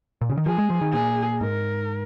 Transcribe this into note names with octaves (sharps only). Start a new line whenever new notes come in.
A#2
C#3
D#3
F3 G#4
G#3
F3
D#3
A#2 G#4
G#2 A#4